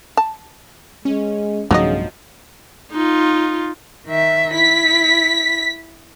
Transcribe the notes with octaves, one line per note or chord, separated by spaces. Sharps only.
A5
G#3 C#4
B1 G2 C#3 F3 F#3 A3 D#4 D#5
D#4 F4
D#3 E5
E4 B6